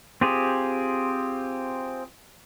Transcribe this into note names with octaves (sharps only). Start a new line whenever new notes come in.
C4 F4 G4 G#4